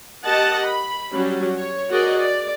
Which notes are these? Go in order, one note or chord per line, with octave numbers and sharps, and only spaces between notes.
G4 A#4 D#5 F#5 A5
B5
F#3 G3 C#4 F#4
C#5
F#4 G#4 A#4 D5 D#5
D5